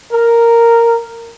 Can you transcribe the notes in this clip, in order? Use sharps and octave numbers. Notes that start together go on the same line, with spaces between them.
A#4